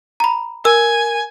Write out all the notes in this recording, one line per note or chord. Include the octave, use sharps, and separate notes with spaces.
A#5 B5
A#4 G#5 E6